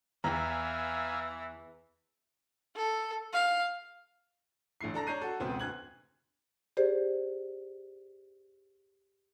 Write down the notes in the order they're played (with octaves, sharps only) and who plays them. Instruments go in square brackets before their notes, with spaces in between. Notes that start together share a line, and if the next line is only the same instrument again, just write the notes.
[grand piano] E2 [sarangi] E3 [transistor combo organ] E5 F5 G#5 [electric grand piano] A#5
[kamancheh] A4
F5
[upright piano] A1 D3 A3 E4 C7
D4 A4 A#5 A#6
D4 C#5 A#5 G6 C7 D#7
F#4 A4
E1 C#2 B3 C4
D2 F#6 G#6 F#7
[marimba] G4 G#4 C5 D5